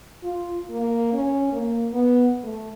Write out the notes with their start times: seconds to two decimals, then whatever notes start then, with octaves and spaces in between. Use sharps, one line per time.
0.24 F4
0.70 A#3
1.13 C#4
1.53 A#3
1.93 B3
2.44 A3